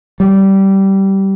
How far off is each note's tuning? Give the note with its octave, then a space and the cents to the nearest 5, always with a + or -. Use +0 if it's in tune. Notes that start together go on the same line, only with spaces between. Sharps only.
G3 -15